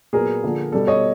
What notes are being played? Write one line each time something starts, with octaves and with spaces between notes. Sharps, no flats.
A#2 F#3 B3 G#4 A#4
D3 F3 A#3
B2 G3 B3 A4
C#5 D#5